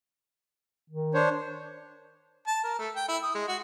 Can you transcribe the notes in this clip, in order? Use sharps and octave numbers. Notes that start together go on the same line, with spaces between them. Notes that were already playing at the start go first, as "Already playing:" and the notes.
D#3
D4 C5 C#5
A5
A#4
A3
G5
E4
D#6
G#3
F#4